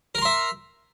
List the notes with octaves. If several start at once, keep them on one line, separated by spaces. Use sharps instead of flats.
A#4 E5 A#5 C6